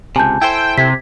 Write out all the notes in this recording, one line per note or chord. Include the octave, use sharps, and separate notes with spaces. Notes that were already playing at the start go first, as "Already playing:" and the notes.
C#2 C3 G#5 A5 G6
E4 A4 C5 G5
C3 G#6 B6